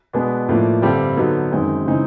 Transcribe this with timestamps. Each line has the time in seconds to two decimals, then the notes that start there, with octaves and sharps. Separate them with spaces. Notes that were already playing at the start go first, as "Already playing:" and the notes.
0.13 B2 G#3 B3 D4
0.49 A2 F3 A#3 D4
0.82 G2 D3 G3 C4
1.17 D3 F#3 B3 D#4
1.51 F#2 D#3 G#3 C4 D#4
1.86 C#3 E3 G#3 C4 D#4